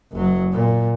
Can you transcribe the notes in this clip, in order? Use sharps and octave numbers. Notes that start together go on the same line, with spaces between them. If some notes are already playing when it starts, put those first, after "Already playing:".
F#1 F#3
A#2